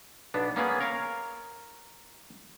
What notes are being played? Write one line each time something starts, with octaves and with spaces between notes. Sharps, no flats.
B1 B3 D4
A#3 B3 C#4 G#4
A#4 C#5 F5